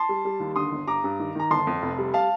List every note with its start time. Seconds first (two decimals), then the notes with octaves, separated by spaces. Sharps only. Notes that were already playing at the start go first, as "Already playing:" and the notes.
Already playing: A5 C6
0.09 G3
0.25 G3
0.40 D#2
0.56 D3 C6 D#6
0.72 G1
0.87 G2 A#5 D6
1.04 G2
1.19 D#3
1.35 D#3 A#5
1.51 G1 A5 C6
1.67 F2
1.82 F1
1.98 G3
2.14 F5 A5